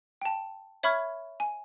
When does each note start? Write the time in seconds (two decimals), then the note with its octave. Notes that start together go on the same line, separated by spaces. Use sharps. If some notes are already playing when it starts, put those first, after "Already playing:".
0.22 G5 A5
0.83 C#5 E5 B5 C#6 F6 G#6
1.40 G#5